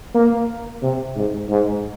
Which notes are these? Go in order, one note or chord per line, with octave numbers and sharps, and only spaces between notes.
A#3
C3
G#2
G#2